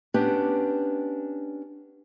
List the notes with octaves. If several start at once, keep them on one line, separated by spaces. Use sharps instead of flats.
B3 C#4 D4 G4